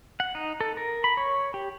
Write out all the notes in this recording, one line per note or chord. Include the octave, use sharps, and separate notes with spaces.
F#5
D#4
A4
A#4
B5
C#5
G4